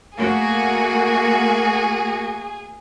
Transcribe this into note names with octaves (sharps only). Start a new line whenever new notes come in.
A3 A#3 F#4 G#4